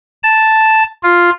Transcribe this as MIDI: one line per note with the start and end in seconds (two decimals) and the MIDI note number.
0.23 0.83 81
1.03 1.30 65